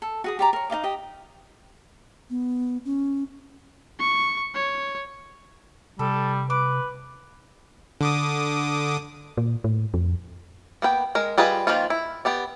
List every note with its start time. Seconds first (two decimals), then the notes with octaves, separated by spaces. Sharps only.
0.02 A4
0.24 F#4 G#4 D#6
0.39 G4 D5 A#5
0.53 A#4 C#5
0.70 D#4 D#5 F5 D6
0.84 G4 D#5
2.30 B3
2.85 C#4
3.99 C#6
4.54 C#5
5.99 C3 G3 A4
6.50 B4 D6
8.01 D3 D6 D#6
9.37 A#2
9.64 A2
9.94 F2
10.82 A#3 B3 B4 G5
11.15 G#3 A#4
11.38 G3 F4 G#4 B4 D#5
11.67 D#3 F3 A#3 F4
11.90 E4
12.25 B3 G4 D5